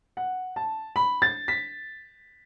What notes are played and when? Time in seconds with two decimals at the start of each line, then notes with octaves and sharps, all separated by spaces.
0.17 F#5
0.56 A5
0.96 B5
1.22 A6
1.48 B6